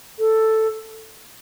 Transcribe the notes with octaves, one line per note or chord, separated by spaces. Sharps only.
A4